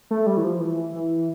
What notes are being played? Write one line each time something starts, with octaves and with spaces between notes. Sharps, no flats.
A3
G3
E3
F3
E3
E3